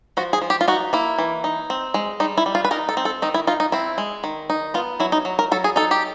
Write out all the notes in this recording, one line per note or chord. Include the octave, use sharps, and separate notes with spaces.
F3 F#4
G#4
F3
G4
F4
D#4 F#4
A#3 E4
E3
D#4
C4
G#3
G3 D#4
E4
G3
F4
B4
D#4 A#4
A4
C4
A4
D#3 D#4
E4
D#4 F4
D#4
C4 E4
G#3
D#3
D#4
B3 F4
F#3 E4
D#4
F#3
A#4
F#3 A4
G#4
D#4 A4
G4